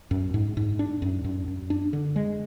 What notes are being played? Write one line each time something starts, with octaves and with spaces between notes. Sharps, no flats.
F#2
G#2
G#2
D4
F#2
F#2
F#2
D4
D3
G#3